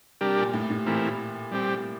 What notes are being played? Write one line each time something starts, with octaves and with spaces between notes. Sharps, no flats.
C3 G3 D4 G4 A#4
A#2
A2
A2
A#2 E3 A3 C4 E4 A#4
G3 C4 G4